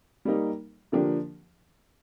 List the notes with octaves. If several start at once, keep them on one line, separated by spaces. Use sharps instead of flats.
G3 A#3 D#4
D3 F3 A#3 D4 G4